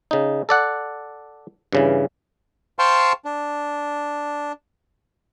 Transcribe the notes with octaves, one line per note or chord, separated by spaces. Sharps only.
C#3 D#4
A4 D5 F#5
G2 C#3 E3
C5 F5 G5 A5 C6 C#6
D4